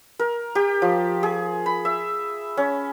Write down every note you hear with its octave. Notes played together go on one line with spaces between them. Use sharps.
A#4
G4
F3
G#4
B5
E5
C#4